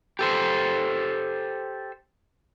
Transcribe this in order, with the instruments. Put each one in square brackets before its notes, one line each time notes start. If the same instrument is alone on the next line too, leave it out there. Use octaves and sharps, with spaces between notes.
[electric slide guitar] G4 A4 C5